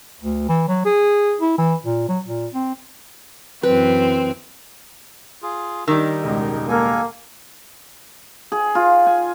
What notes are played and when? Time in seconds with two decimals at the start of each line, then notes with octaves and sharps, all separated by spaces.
0.21 D2
0.49 E3
0.68 F#3
0.85 G#4
1.41 E4
1.58 E3
1.85 A#2
2.08 F#3
2.25 A#2
2.54 C4
3.63 F#2 E3 C4 B4
5.42 F4 G#4
5.88 D#3 G3 D#4 A#4 E6
6.23 E1 C#2
6.69 A#3 A4 G#5
8.52 G#4
8.75 F4
9.06 G#5